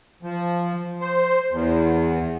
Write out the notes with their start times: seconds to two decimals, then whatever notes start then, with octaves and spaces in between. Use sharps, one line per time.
0.23 F3
1.01 C5
1.52 E2